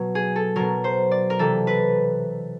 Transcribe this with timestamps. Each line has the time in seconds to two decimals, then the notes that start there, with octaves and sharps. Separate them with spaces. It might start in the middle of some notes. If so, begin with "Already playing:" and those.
Already playing: B2 F#3
0.15 G#4
0.36 A4
0.56 B2 F#3 A#4
0.84 C5
1.11 D5
1.30 A#4
1.39 C3 E3 A4
1.67 B4